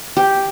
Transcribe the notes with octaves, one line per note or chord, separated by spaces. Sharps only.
G4